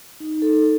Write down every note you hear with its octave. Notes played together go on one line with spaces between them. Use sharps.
D#4
A4